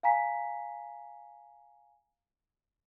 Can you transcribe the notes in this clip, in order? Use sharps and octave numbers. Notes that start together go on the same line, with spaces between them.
F5 G#5 A#5 B6